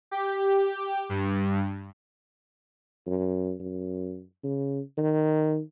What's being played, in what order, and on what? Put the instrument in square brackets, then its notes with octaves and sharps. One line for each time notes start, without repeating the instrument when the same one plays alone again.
[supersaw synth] G4
G2
[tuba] F#2
F#2
C#3
D#3